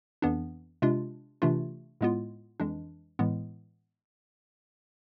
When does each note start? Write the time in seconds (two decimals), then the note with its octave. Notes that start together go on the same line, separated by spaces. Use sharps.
0.22 F2 E3 B3 D4
0.82 C3 G#3 D4 F4
1.42 C3 E3 A3 D4 F4
2.01 A2 G#3 B3 F4
2.60 F2 E3 G#3 D4
3.19 A2 E3 G#3 B3